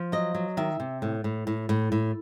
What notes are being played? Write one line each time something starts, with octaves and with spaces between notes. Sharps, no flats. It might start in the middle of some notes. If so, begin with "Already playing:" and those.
Already playing: F3
F#3 D#5
F#3
D#3 E5
C3
A2
A2
A2
A2
A2